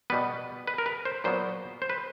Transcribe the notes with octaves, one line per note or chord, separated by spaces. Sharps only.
B2 G3 B3 B4
B4
A#4
B4
C5
A#2 F#3 B3 C5
C5
B4